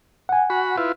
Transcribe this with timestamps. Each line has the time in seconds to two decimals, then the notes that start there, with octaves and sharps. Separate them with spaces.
0.29 F#5 G#5
0.50 F#4 B5
0.77 E4 F4 B4